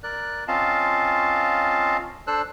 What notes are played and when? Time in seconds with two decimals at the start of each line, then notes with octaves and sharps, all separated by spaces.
0.03 A#4 D5 F#6
0.48 C4 C#4 F4 D#5 F5 A5
2.27 D4 A4 C5 E6 F#6